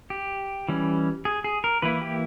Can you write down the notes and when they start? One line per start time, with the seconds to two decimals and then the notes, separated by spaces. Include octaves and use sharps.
0.10 G4
0.69 E3 G3 C#4
1.25 G#4
1.44 G#4
1.64 A#4
1.82 E3 A#3 E4 B4
2.01 G4